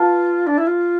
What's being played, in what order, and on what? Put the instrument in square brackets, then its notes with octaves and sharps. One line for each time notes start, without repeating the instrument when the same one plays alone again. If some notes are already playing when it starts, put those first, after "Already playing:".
Already playing: [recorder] F4 [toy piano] B4 F5 A5
[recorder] D4
E4
F4